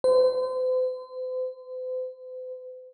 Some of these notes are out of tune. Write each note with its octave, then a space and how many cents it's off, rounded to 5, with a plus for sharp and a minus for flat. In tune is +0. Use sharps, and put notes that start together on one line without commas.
C5 -40